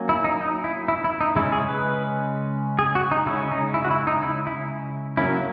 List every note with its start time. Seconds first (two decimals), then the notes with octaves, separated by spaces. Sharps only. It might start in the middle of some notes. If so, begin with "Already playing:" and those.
Already playing: F#3 A#3 C#4
0.09 E4
0.24 D#4
0.41 D#4
0.64 E4
0.88 E4
1.04 E4
1.21 D#4
1.35 C#3 G#3 C#4 E4
1.52 G#4
1.68 B4
2.79 G#4
2.95 F#4
3.11 D#4
3.26 C#3 G#3 C#4 E4
3.51 D#4
3.74 E4
3.84 F#4
3.91 E4
4.07 D#4
4.23 E4
4.47 E4
5.17 F#3 A#3 C#4 E4